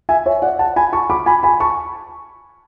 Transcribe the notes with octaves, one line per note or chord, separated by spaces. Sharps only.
E5 G#5
C#5 E5
D5 F#5
F#5 A5
G#5 B5
A5 C#6
B5 D6
G#5 B5
G#5 B5
A5 C#6